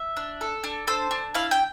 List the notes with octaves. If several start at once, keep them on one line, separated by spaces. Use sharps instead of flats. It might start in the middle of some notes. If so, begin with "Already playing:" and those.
Already playing: E5
D4
A4
D4
A4 C5
D4
E4 F5
G5